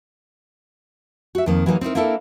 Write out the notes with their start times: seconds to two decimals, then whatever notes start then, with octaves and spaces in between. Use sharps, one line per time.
1.35 F#4 E5
1.46 F2 D#3 A#3
1.66 E3 F#3 G3 A#3 D#4 G#4
1.81 C4 D#4 E4 A#4
1.95 A#3 B3 D4 E4 A4 A#4